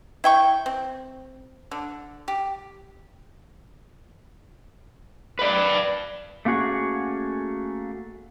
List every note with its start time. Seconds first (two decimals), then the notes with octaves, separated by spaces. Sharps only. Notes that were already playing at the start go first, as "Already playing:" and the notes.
0.24 E4 G5 C#6
0.66 C4
1.71 D3
2.28 G4
5.39 B4 D5
6.45 A3 A#3 C#4 F#4 G#4